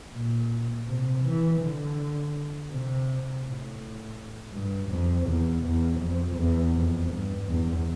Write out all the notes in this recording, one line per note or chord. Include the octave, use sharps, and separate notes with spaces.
A#2
C3
E3
D3
C3
A2
G2
F2
E2
E2
F2
E2
F2
G2
E2